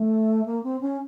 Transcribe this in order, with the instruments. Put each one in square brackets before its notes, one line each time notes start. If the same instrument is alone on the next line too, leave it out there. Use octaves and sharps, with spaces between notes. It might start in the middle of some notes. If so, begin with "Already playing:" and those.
Already playing: [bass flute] A3
A#3
C4
C#4